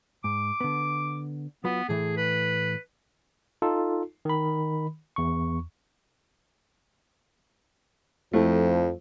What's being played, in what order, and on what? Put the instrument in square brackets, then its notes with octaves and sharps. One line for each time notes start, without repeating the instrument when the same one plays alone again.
[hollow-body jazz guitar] G#2 [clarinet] D6
[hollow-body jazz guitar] D3 B3
[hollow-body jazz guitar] F#3 F4 B4 [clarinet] B3
[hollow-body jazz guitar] A2 E3 A3 [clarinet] G#4
[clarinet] B4
[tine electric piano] D#4 F4 A4
D#3 B5
E2 C#6
[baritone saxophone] F2 [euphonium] F3 [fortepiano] A3 E4